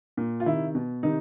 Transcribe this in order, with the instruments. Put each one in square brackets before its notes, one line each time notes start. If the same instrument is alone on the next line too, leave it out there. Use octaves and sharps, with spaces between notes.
[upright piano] A#2
F4
C3 D#3 E4
B2
C3 D#3 D#4